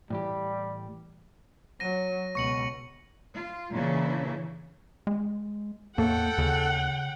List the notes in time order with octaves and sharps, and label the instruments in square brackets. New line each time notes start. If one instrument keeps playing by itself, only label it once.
[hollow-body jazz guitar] A2 E3 G4 [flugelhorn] G3
[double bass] F#3 [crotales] A#6 D#7
[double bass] C#2 B2 [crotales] C#6 C#7 F#7
[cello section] F4
A#2 C#3 E3 C#4 D4 E4
[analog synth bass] G#3
[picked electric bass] E2 A2 A3 [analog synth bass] A#3 [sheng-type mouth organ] A4 [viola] F#5 G5
[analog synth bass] D#2 [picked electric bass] C#3